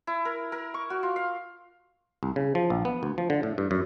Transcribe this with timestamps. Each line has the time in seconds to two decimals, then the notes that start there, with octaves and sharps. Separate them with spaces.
0.07 E4
0.25 A#4
0.52 A#4
0.74 C#6
0.90 F#4
1.03 F4
1.16 F5
2.23 C2
2.36 C#3
2.55 F3
2.70 A#1
2.85 B3
3.03 D2
3.18 F3
3.30 D3
3.43 A2
3.58 G2
3.71 F#2